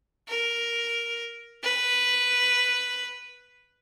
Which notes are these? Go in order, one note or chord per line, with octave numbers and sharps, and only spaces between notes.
A#4
B4